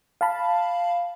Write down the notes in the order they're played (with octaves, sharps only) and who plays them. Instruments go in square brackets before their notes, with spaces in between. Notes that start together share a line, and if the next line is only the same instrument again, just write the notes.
[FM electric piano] F5 A5 B5